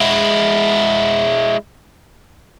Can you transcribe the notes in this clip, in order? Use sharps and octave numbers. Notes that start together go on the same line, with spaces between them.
G#3 E4